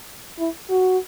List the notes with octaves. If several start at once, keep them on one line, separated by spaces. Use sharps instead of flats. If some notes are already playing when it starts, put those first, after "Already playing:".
E4
F#4